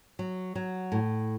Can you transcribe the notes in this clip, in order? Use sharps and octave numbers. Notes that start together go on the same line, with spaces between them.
F#3
F#3
A2